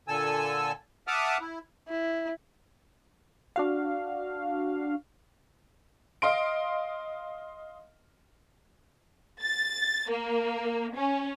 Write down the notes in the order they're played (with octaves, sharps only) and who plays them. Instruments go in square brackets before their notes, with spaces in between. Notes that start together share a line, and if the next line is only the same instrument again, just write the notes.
[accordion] A#2 D3 A4 G#5 E6
E5 F#5 A5 D6 D#6 F6
E4
[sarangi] E4
[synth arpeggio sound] D4 F#4 F5
[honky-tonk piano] D#5 F5 C6 D7
[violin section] A6
A#3
C#4